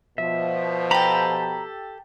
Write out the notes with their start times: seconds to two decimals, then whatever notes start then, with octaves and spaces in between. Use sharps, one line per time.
0.18 B2 F3 E5
0.91 G4 A4 A#5 B5